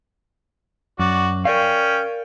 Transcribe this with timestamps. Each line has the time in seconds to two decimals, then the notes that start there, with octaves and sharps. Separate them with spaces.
1.00 F#2 F#4 D5
1.45 C#4 A#4 D5 F5 G5